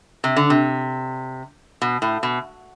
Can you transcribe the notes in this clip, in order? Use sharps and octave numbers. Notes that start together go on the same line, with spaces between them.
C3
D3
C3
B2
A2
B2